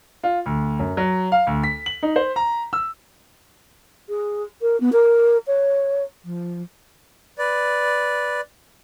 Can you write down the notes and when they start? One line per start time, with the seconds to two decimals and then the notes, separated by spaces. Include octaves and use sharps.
0.23 F4
0.46 D2
0.79 F#2
0.97 F#3
1.32 F5
1.47 D2
1.63 B6
1.86 F#7
2.03 D#4
2.16 C5
2.36 A#5
2.73 E6
4.09 G#4
4.61 A#4
4.80 B3
4.92 A#4
5.47 C#5
6.24 F3
7.39 B4 D5